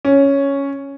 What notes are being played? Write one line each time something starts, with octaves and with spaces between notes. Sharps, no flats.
C#4